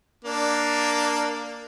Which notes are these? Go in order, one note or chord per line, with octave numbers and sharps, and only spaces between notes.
A#3 D4